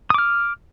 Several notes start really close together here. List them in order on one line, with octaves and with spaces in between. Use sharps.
D#6 D6 F6